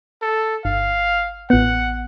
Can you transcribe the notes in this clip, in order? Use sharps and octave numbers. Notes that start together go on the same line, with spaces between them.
A4
G1 F5
A1 B3 F#5